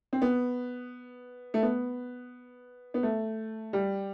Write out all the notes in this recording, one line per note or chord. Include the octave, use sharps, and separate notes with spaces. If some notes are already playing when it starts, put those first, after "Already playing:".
C4
B3
A3
B3
B3
A3
G3